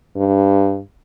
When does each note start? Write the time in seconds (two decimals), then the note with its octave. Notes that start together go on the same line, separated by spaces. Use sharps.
0.17 G2